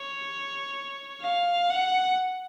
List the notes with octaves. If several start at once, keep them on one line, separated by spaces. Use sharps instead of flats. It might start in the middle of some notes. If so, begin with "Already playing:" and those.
Already playing: C#5
F5
F#5